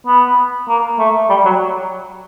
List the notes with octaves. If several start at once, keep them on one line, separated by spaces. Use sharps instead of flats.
B3
A#3
A3
G3
F#3